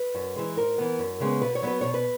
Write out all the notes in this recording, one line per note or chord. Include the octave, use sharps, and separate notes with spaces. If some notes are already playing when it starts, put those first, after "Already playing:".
Already playing: B4
F#2
E3 G#3
G#2 A#4
E3 B3
F#2
C#3 G#3 B3
B2 B4
C#5
F#3 B3 B4
B2 C#5
B4